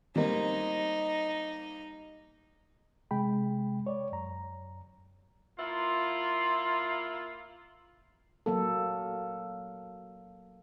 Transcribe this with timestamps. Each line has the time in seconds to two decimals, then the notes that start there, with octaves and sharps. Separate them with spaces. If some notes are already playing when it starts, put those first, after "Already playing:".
0.16 G3 A#3 C4 D#4
3.11 C3 G#3 G5 B5
3.87 C#5 D5
4.12 F#2 A#5
5.60 A#3 E4 F4
8.46 F#3 A#3 A4